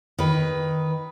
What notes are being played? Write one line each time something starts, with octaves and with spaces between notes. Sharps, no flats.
D#3 B4